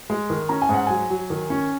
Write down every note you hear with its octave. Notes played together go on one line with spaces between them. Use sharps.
G#3
D#3
C#4 A#5
G#5
G#2 F#5
F#3 G#5
F#3
D#3
C#4